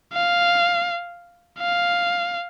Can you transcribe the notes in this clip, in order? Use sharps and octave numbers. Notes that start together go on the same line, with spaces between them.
F5
F5